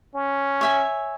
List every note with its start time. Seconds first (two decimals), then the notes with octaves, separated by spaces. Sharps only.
0.15 C#4
0.61 C#5 E5 G#5